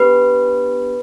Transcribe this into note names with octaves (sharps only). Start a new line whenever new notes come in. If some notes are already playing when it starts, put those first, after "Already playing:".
Already playing: B3 D4 G4 B4